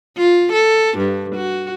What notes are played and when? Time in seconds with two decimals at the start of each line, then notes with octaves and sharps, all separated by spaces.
0.17 F4
0.52 A4
0.98 G2
1.35 F#4